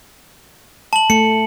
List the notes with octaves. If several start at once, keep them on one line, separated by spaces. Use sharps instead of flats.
A5 F#7
A3 C#7